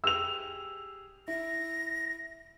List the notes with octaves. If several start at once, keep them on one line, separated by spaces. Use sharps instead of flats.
G4 G#4 E6 F7
E4 A#6